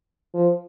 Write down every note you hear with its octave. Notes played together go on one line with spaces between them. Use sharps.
F3